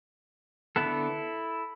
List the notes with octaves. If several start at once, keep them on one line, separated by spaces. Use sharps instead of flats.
D3 B3 E4 A4